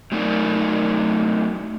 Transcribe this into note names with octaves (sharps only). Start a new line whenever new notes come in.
F#3 A3 D#4 A#4 D5